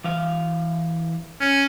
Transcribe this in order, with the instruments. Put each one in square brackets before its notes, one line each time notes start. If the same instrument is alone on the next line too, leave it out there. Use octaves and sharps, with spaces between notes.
[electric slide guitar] E3 F5
[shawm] C#4